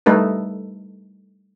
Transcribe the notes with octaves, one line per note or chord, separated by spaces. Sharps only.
G3 A3 D#4 A4 B4